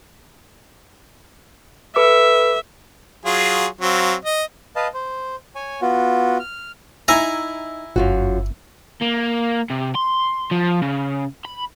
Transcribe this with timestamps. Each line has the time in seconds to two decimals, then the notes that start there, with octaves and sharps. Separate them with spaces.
1.96 A4 B4 E5 D6
3.25 F#3 F4 G#4
3.81 F#3 C4 F5
4.25 D#5
4.76 B4 D#5 F5 A5
4.94 C5
5.55 C#5 G#5
5.82 B3 F4 F#4
6.40 F6
7.08 D#4 E4 G#5 A#5
7.96 G1 F#2 F4 F#4
9.01 A#3
9.70 C3
9.95 C6
10.51 F3
10.82 C#3
11.45 B5